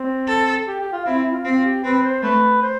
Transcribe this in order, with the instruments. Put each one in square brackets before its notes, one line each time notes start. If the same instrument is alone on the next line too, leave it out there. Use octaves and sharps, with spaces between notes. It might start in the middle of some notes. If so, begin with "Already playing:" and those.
Already playing: [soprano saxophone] C4
[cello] A4
[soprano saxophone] G4
G4
F4
[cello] C4 [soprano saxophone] E4
[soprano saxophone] E4
F4
[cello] C4 [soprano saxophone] F4
[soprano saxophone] G4
[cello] C4 [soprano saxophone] B4
[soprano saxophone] C5
[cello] A3 [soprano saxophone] B4
[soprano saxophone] C5